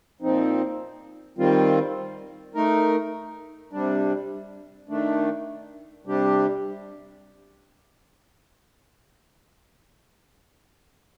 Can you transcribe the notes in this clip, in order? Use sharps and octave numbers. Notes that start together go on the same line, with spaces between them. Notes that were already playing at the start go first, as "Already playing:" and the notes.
A#2 F3 C4 D#4
D#3 G3 C4 F4
A3 D#4 A#4
C3 G3 D4
D#3 A3 D4
C3 G3 D4 G4